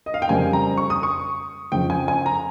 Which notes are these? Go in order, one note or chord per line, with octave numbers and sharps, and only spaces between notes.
D#5
F5
G5
F2 C#3 G3 A#3 G#5
A#5
C#6
D#6
C#6
F2 C#3 F3 G5
G#5
G#5
A#5